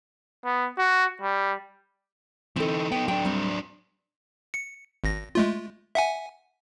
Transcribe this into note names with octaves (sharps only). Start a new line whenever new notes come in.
B3
F#4
G3
E3 C4 D#4 A4
B3 D#4 G5
F#3 D4 G5
G3 C4
C#7
G#1 A#6
G#3 A3 F4
E5 F#5 G#5